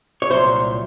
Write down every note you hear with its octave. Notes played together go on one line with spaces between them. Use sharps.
C#5
C2 A#2 F#3 C5